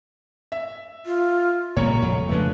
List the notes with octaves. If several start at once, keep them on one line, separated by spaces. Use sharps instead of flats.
E5
F4
A#2 C#3 G3 C#5 A#5
F2
C#3 F3 G#3 A3 D4 B4